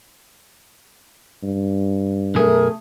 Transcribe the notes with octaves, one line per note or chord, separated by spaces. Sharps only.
G2
B1 F#2 A3 G#4 A#4